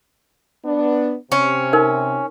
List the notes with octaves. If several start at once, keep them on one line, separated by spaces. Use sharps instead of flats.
B3 D4
C3 C#4
D#4 A#4